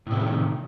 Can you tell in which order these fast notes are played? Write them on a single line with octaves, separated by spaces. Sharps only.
A2 C3 E3 D#3